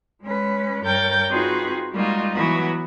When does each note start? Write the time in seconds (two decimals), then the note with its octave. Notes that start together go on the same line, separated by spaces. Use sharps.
0.23 G#3 C#4 B4
0.84 G2 A#4 C#5 G5 G6 A6
1.30 C4 D#4 F4 F#4 G#4 B4
1.92 G3 G#3 A#3 D#4 F4 F#4
2.34 E3 F#3 B3 F#4